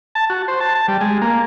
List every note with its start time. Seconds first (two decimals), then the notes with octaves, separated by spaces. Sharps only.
0.15 A5
0.30 F#4
0.48 C5
0.60 A5
0.75 A5
0.88 G3
1.01 G#3
1.22 A#3